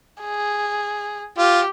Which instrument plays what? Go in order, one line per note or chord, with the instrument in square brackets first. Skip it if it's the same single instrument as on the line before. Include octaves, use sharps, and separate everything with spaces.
[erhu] G#4
[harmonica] F4 [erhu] G4